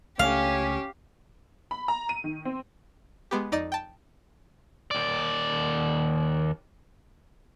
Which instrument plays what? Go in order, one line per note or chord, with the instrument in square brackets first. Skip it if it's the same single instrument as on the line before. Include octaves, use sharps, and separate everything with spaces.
[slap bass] C#2 A3 [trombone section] C#4 [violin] G4 [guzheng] F5
[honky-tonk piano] B5
A#5
D#7
D#3
C4
[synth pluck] G#3 B3 G4
F2 D#4 D5 D#5 A6
G5 A5
[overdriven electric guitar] D#2 D5